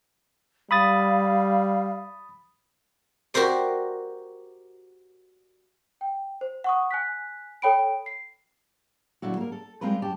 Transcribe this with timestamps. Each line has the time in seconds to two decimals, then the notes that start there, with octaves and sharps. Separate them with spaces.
0.71 G3 F5 B5 D#6 A6
3.34 F#4 G4 A#4 C5 D5
6.01 G5
6.41 C5
6.64 F#5 C#6 D#6
6.91 G#5 F#6 B6
7.62 A4 C#5 G5 B5 D7
8.06 C7
9.22 A#2 D3 F#3 E4 F#4
9.37 A#3 A#4
9.52 A4
9.81 G3 G#3 C4 F4 A#4 B4
10.02 F#2 G4 A5